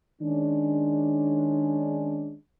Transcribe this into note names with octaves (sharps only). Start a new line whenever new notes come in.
D#3 G#3 C#4 D4